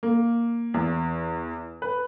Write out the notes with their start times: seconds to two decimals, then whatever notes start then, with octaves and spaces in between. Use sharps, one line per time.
0.03 A#3
0.74 E2
1.82 B4